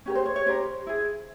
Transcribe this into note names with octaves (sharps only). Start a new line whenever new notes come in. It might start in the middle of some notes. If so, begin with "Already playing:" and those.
C#4 G4 A#4
C5
C#5
C#5
C#4 G4 A#4 C5
E4 G#4